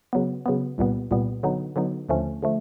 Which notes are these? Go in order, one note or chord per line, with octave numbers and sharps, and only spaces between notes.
C#3 F#3 B3
C#3 F#3 B3
C2 A#2 G3 B3
C2 A#2 G3 B3
D3 F#3 B3 D#4
D3 F#3 B3 D#4
D#2 D3 F3 A3 C#4
D3 F3 A3